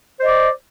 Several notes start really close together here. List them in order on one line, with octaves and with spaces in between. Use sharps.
C5 D#5 D5